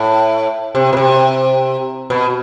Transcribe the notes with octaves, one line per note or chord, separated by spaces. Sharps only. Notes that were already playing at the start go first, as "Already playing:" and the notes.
Already playing: A2
C3
B2
C3
B2